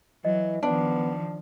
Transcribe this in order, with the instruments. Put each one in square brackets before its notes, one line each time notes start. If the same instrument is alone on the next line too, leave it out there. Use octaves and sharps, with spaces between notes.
[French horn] E3 [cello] F#3 [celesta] D#5
[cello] D#3 F3 [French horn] B3 [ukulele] D4 [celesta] A5